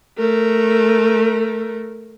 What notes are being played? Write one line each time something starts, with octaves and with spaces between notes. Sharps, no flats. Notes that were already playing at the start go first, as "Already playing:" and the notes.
A3 A#4